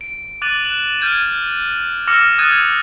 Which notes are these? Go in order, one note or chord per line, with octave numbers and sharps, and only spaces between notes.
D7
D6 F#6 A6 D#7 F#7
F#6 E7 F#7
F6 G6 G#6 D7 D#7
D6 E6 F6 A#6 C#7 E7
D#6 F6 F#6 G#6 A6 D#7